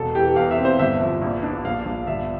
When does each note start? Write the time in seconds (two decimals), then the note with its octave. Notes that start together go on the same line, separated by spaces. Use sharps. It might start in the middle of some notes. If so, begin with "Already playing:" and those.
Already playing: E1 A4
0.15 E3 G4
0.36 E2 F5
0.51 E5
0.58 C4
0.65 C5
0.79 G1 E5
1.00 F3 E5
1.22 A#1
1.43 D4
1.65 A#1 F5
1.85 A#1
2.07 G1 E5